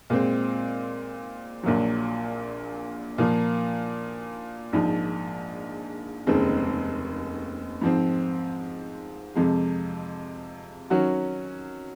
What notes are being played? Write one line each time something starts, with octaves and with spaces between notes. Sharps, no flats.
A#2 G#3 C4
A#1 A#2 F#3
A#2 F3 A#3
A#1 G#2 F3
F1 D#2 C#3 G#3 C4
G#2 F3 C4
F2 C3 F3 G#3
D#3 F#3 C#4 F#4